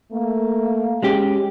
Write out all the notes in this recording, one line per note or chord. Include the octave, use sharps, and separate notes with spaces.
A3 A#3
G#3 C#4 G4